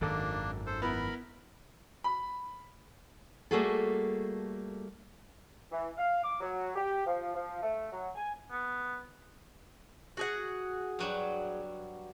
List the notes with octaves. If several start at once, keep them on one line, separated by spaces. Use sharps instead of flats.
G#1 F#2 D#3 A#3 D4 A4
A4 C5
B3 E4 A#4 B5
B5
G3 A3 A#3 F#4 G#4 A4
E3
F5
D6
F#3
G4
F3
F3
A3
F#3
G#5
B3
F#4 G#4 F#5
G2 F#3 G3